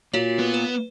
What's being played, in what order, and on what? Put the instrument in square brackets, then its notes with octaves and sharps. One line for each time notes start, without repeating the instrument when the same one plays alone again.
[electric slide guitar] A#3 F4 [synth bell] F#4 C#5
[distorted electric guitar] B3
[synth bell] B4